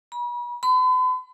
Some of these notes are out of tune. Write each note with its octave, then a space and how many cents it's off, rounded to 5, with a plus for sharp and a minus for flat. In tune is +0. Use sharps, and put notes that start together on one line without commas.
B5 -40
B5 +45